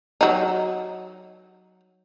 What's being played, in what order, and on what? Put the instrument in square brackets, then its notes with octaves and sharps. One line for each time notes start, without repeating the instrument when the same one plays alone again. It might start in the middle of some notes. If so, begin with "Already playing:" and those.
[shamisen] F#3 D#4